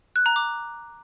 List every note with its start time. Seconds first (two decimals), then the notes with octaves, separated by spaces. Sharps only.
0.16 F#6
0.26 A#5
0.36 D6